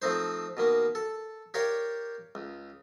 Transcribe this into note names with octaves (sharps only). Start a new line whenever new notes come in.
F3 A3 C4 D#4 C5
B2 D#3 A#3
A4
G4 A#4 C#5 D5 F5 G5
C#2